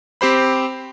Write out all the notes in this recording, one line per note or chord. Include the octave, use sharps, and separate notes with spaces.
C4 G4 C5 B5